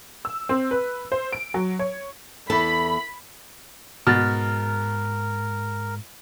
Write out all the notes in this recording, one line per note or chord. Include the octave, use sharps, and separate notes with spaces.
E6
C4
B4
C5
D7
F#3
C#5
E2 A4 B5
G#2 B2 A#4 F6 A6